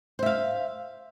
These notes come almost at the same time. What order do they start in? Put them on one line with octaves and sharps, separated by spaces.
C5 E5 F5